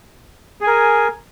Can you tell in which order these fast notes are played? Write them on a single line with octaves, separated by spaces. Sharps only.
G#4 G#5 A#4